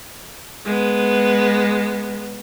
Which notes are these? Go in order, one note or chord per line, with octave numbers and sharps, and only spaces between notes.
G#3 B3